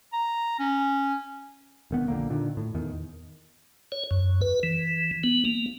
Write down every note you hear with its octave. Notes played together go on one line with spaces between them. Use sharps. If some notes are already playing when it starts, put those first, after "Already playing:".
A#5
C#4
E1 D#3 B3
A#1 D3 A#3
A#2 D3 D#3
A2
E2 D#3
C#5
F#2
B4
E3
B3
A#3